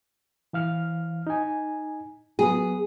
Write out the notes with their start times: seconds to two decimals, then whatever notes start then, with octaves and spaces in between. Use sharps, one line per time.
0.53 E3 F5 F6
1.27 D#4 G#5
2.39 F#3 B3 G#4